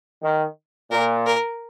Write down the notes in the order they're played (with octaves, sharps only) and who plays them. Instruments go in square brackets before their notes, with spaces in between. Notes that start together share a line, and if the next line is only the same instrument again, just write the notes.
[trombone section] D#3
[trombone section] A#2 [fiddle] A#4
[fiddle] A#4